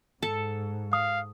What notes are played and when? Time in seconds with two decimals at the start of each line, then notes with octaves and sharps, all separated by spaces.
0.23 G#2 A4
0.93 F5 D#6